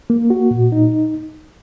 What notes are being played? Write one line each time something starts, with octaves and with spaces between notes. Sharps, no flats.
A#3
F#4
A#2
D#4